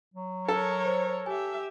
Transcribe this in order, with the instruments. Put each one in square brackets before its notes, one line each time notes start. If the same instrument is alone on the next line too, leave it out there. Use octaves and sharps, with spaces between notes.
[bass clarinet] F#3
[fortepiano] A4 [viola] A#4 C#5
[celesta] C5
[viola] G4 E5 [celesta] G#5